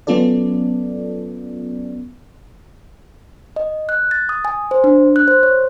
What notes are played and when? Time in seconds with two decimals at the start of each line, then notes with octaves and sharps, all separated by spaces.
0.07 F#3 B3 C#4 F4 A4 D5
3.56 D#5
3.89 F#6
4.11 A6
4.29 D#6
4.45 G#5
4.71 C5
4.84 D4
5.16 F#6
5.28 C5
5.43 C#5